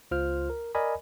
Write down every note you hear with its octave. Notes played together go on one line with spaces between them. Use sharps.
C#2 F4 C5 F6
A#4
A#4 D5 D#5 G#5 B5